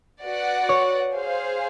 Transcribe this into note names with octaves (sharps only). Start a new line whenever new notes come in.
F#4 B4 D5 F#5
C#5
G#4 C5 F5